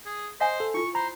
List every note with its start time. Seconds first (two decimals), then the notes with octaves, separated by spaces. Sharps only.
0.06 G#4
0.41 C5 D#5 F5 G#5
0.60 A4
0.74 E4 F4 C#6
0.95 C5 A#5 B5